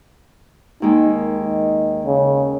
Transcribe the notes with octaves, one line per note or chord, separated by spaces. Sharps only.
D#2 G#3 D#4
D#3
C#3